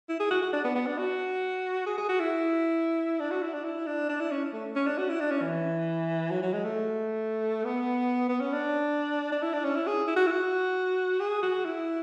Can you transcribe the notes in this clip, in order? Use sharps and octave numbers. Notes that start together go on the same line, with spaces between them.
E4
G#4
F#4
F#4
D4
B3
B3
D4
F#4
G#4
G#4
F#4
E4
D4
F#4
E4
D4
E4
D4
D4
E4
C#4
A3
C#4
D4
F#4
E4
D4
C#4
E3
F#3
F#3
G#3
A3
B3
B3
C#4
D4
D4
E4
D4
C#4
E4
G#4
E4
F#4
E4
F#4
G#4
F#4
E4